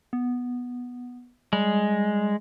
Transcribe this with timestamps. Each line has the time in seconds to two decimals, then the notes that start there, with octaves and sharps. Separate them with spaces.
0.13 B3
1.53 G3 G#3